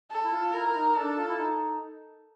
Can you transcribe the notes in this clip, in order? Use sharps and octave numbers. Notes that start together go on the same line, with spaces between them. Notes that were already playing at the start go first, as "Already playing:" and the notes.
A4
E4
F4
E4 A#4
D#4
D4 A4
F4
E4
D#4